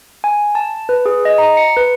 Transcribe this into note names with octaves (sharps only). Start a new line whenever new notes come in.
G#5
A5
B4
G#4
D#5
A#5
C#7
B4